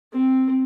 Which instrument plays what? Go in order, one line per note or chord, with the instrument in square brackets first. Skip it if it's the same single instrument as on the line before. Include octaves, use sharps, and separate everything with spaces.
[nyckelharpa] C4